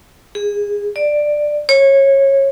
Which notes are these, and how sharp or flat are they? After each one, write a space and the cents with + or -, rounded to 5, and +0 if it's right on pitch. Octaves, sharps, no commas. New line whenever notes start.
G#4 -20
D5 +10
C#5 -20